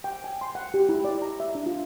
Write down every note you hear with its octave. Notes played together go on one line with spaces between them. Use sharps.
G5
G#5
C6
F#5
G4
E4
D5
A#5
E5
D4
F4